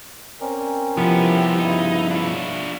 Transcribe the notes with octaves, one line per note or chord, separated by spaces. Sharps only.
C4 C#4 A#4 D5
C2 F3 B3 E4 G4
G2 C#3 D#4
D4 F4